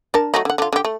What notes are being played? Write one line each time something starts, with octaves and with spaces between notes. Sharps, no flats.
D4 A#4 A5
F#3 A3 D#4
D3 F#5
D3 F4
D3 G4
A3